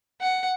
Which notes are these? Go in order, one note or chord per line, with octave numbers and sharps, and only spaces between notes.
F#5